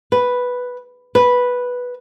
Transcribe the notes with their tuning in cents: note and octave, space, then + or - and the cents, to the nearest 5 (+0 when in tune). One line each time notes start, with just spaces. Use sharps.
B4 +0
B4 -5